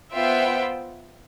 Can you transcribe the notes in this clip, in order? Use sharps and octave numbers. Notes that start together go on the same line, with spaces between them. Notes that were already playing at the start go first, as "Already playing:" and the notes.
B3 F4 C5 E5 G5